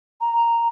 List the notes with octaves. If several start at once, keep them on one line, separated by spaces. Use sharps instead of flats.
A#5